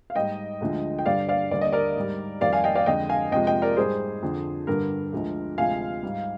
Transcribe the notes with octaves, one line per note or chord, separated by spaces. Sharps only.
F5
G#2 G3 D#5 G5
D2 D3 F3 G#3
G5
G2 D3 G3 D5 F5
D5 F5
D#2 D3 G3 D5
D#5
A#4 D5
G#2 G3
F2 D#3 G3 D5 F5
F5 G#5
D#5 G5
D5 F5
F2 D3 G#3 D#5 G5
F5 G#5
F2 C3 F3 G#3 D#5 G5
D#5 G5
A#4 D5
G#2 G3 G#4 C5
F2 D3 F3
G2 D3 G3 A#4
D2 D3 F3 G#3
D2 C3 F3 G#3 F5 G#5
G#2 G3